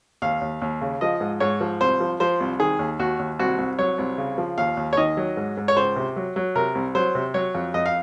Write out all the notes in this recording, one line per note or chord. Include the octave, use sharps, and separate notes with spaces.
D#2 F5
D#2
D#2
C#3
F3 D#5
G#2
G#2 C#5
F3
C2 C5
F3
F3 C5
C2
D#3 G#4
D#2
D#2 F#4
D#2
C2 F#4
C2
F#3 C#5
C2
C#3
F3
D#2 F5
D#2
C#5
D#3 D#5
F#3
G#2
G#2
C#5
C#2 C5
C3
F#3
F#3
C3 A#4
C2
F#3 C5
C3
F#3 C#5
F2
F2 D#5
F5